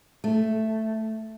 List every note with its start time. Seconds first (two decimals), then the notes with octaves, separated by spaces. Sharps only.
0.24 A3